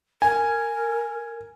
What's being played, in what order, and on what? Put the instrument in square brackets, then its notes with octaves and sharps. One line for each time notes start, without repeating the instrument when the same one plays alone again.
[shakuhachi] A#4 [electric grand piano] G#5